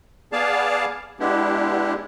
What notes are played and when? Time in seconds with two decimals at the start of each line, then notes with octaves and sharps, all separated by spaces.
0.33 B3 G#4 D5 F5 A5
1.20 G#3 B3 D4 E4 G4